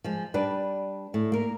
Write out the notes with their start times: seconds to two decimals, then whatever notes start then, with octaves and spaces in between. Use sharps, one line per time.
0.04 F3 G#3
0.34 G3 D4 B4
1.14 A2
1.32 A#3 A#4